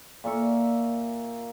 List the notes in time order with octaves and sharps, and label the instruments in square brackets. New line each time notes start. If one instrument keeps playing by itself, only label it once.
[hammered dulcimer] A#2 A#3 E5 C#6